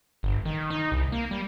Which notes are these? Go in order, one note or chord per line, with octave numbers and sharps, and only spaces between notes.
G1
D#3
D#4
C2
A#3
G3